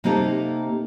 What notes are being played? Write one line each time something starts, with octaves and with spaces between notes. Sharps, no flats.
C3 A#3 C4 D#4 G4 A4